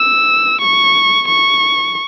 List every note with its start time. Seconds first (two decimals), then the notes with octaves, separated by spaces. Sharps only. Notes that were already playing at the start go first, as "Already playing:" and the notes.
Already playing: E6
0.61 C#6
1.28 C#6